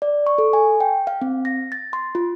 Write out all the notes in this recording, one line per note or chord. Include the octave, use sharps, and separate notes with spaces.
D5
C#6
A4
G#5
G5
F5
C4
A#6
A6
C6
F4